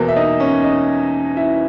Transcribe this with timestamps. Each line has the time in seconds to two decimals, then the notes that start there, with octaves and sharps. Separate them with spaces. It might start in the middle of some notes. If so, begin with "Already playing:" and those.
Already playing: E2 B2 A#3
0.08 E5
0.16 D#4 D#5
0.40 C#4 C#5
0.64 D#4 D#5
1.37 E4 E5